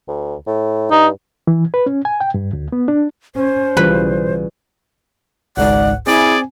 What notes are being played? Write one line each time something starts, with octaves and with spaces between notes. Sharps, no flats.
D2
A2
G2 D#4
E3
B4
C#4
G#5
G5
G2
D2
B3
D4
C#4 C5
B1 C#3 E3 G3 F4 B4
G#1 C#2 G#2 D5 F#5
C4 E4 G#4 D5 G#5